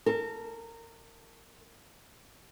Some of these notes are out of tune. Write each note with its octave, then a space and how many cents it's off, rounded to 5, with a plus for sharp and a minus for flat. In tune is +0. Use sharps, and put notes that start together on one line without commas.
A#4 -25 A5 +0